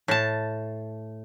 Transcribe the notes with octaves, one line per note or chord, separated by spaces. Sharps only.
A2 A5